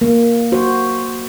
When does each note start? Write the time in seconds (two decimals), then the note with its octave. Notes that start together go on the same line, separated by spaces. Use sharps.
0.01 A#3
0.52 F#4 C5